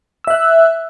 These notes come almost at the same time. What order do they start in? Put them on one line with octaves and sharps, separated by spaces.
E6 E5 F#6